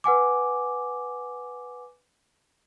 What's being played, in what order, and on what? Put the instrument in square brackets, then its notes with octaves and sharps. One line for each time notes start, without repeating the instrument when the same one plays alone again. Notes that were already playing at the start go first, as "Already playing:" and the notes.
[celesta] B4 F#5 G#5 D6